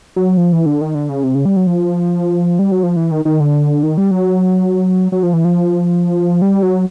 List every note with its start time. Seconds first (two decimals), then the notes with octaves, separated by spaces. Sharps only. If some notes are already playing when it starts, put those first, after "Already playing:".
0.16 F#3
0.37 F3
0.52 E3
0.66 D3
0.81 D#3
0.95 D3
1.09 C#3
1.24 C3
1.35 C#3
1.45 G3
1.56 F#3
1.67 F3
2.59 G3
2.72 F#3
2.83 F3
2.96 E3
3.11 D#3
3.25 D#3
3.40 D3
3.83 D#3
3.98 G3
4.11 F#3
5.12 F#3
5.23 F3
5.33 E3
5.45 F3
6.42 G3
6.63 F#3